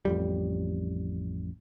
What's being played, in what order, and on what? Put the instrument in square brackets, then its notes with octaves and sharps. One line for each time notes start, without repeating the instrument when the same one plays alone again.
[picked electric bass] A1 F2 G3